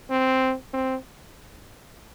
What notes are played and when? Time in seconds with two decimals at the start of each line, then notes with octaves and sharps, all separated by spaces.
0.10 C4
0.73 C4